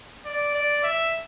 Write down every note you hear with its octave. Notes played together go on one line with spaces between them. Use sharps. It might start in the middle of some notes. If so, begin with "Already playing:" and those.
D5
D5
E5